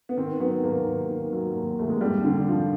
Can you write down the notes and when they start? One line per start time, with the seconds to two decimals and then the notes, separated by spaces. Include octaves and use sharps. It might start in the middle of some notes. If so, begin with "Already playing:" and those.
0.09 B3
0.17 D#3 C4
0.40 F#3 B3
0.64 D#2 A#3
0.86 D#2
1.10 D#3
1.33 F#3
1.55 D#2
1.79 D#2 A3
1.90 G#3
2.01 F2 G3
2.24 D3
2.48 F3